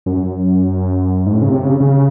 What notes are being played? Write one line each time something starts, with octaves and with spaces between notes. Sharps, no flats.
F#2
G#2
A2
C#3
C3
C#3
C#3